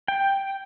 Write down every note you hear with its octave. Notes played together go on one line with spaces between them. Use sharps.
G5